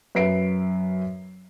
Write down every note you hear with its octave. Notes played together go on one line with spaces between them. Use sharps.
F#2 B4 E5 C7 D7